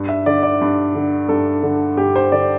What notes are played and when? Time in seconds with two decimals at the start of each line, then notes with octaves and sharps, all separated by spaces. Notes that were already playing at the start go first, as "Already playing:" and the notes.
Already playing: G2
0.09 E5
0.26 D3 D5
0.43 D5
0.61 G2
0.95 D3
1.29 G2 A4
1.63 D3
1.97 G2 G4
2.16 C5
2.32 D3 D5